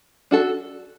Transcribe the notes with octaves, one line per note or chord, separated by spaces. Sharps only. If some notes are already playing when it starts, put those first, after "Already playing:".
D4 F#4 A4